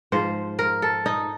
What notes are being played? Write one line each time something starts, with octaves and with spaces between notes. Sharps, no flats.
G#2 F3 C5
A#4
A4
D#4